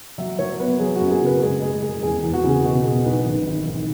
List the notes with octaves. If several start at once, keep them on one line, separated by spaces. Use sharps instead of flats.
F#3 E5
F#3 C#5
B3 B4
F#3 G#4
F#4
F#2
G#4
C#3
B4
G#3 G#4
G#3 G#4
G#3 G#4
E2 G#4
E2
F#4
C#3 G#4
B2 F#4
B2 G#4
B1 B4
G#1
G#1
G#1